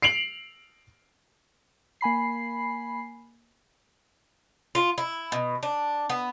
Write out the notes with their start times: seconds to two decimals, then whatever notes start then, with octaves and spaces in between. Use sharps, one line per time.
0.02 C7 D7 F7 F#7
2.01 A#3 G#5 B5 C7
4.75 F4
4.98 E4
5.32 B2
5.63 D4
6.10 B3